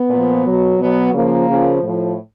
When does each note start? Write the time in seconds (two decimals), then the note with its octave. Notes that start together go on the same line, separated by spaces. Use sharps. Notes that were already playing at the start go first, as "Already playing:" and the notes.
Already playing: B3
0.09 A#2 F3
0.44 B2 F#3
0.79 B2 F#3 B3
1.13 C#3 F3 A#3
1.48 C#3 F3
1.82 A2 F3